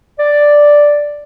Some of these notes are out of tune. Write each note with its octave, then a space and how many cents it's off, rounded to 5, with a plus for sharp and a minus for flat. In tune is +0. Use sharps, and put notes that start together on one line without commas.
D5 +0